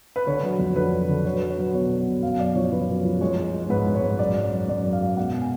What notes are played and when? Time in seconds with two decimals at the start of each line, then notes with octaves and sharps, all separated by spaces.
0.16 B4
0.27 D3 C#5
0.43 F#3
0.59 F2
0.75 D3 B4
0.93 F#3
1.09 D3
1.24 F#3 C#5
1.37 F#3 B4
1.49 C#5
1.58 F#3 B4
1.74 B2 C#5
1.90 F#3
2.06 B2
2.23 F#2 F5
2.39 F#2 D5
2.55 F3 C#5
2.72 F3 B4
2.89 F#2
3.05 F3
3.21 G#3 C#5
3.38 G#3
3.53 G#3
3.70 G#2 B4
3.87 G#2
3.94 C#5
4.03 G#2
4.19 F#2 D5
4.36 F#2
4.52 F#2
4.68 F#2 D5
4.85 F#2
4.93 F5
5.01 G#3
5.17 B2 F#5
5.33 B2
5.41 G#5